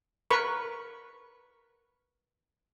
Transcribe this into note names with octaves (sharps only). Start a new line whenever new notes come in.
A#4 B4 B5 C#6